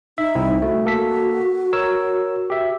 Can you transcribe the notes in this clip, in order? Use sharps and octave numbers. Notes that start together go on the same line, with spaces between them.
D#4 E5
C2 C4 E4
A3 F#4
A#3 A4 B6
A#4 C#5 E6
G4 E5